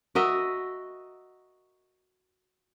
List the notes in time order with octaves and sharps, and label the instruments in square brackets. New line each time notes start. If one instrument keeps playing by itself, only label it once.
[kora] F#4 A#4 D#5 E5